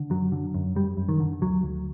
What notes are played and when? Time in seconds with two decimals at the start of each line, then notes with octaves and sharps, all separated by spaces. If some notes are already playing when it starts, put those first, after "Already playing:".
Already playing: D3
0.10 F#2 F#3
0.32 D3
0.54 F#2
0.75 F#2 G3
0.97 F#2
1.09 D#3
1.20 D3
1.41 D2 F#3
1.63 D2